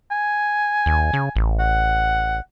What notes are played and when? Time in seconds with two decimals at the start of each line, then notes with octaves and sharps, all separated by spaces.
0.11 G#5
0.86 D#2
1.13 C#3
1.36 A1
1.60 F#5